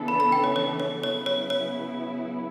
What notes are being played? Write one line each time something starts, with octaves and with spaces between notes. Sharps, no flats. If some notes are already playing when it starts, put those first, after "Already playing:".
Already playing: C#3 E3 B3 D4 A4
B5
B5
G5
C#5
C#5
C#5
C#3 F#3 B3 E4 C#5
C#5
C#5